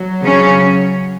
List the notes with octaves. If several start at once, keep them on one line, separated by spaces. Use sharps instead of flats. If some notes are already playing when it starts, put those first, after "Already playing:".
Already playing: F#3
C#3 C#4